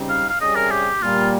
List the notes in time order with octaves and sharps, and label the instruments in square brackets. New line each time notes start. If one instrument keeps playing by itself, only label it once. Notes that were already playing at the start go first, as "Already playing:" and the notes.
Already playing: [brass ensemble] C#3 G3 C4 D#4
[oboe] F5
F5
[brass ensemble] C2 C3 G3 C#4 G#4 [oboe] D#5
[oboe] A#4
G4
[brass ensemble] A#2 G3 A#3 [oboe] F4